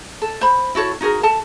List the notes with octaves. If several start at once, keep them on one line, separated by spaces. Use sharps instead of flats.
A4
C5 B5
E4 F#4 A4 C#5
D#4 F#4 G#4 A#4
A4 A5